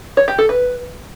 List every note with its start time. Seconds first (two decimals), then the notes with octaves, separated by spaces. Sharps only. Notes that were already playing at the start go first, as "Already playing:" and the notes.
0.17 C#5
0.28 G4
0.38 A4
0.49 B4